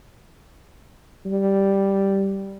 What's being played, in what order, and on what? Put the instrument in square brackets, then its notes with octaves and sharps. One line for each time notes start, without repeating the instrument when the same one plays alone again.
[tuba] G3